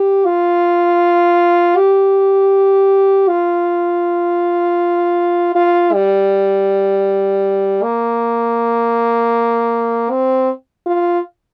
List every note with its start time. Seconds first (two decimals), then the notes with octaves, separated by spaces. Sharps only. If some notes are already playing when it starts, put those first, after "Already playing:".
Already playing: G4
0.25 F4
1.77 G4
3.28 F4
5.55 F4
5.93 G3
7.83 A#3
10.10 C4
10.86 F4